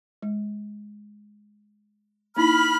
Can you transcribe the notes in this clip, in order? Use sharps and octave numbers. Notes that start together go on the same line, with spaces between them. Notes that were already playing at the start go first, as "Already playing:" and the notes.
G#3
A#3 D#4 E4 B5 F6